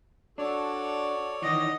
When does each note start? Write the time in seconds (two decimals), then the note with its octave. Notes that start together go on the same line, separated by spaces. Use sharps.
0.38 D4 F#4 A4 C#5 D5
1.42 D#3 E3 D#5 F#5